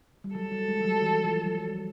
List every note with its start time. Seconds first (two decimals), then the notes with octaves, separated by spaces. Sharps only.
0.24 G3
0.35 F#3 A4
0.52 G3
0.68 G#3
0.80 G3
0.85 F#3
1.02 E3
1.24 F3
1.46 F#3
1.68 G3